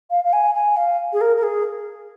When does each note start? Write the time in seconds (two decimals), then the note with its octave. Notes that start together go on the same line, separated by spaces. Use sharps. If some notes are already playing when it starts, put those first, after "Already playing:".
0.10 F5
0.24 F5
0.33 G#5
0.55 G#5
0.77 F5
1.13 G#4
1.21 A#4
1.36 A#4
1.43 G#4